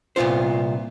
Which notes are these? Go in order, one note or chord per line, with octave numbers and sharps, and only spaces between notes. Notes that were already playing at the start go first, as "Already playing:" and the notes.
C2 A#2 B3 F4 C5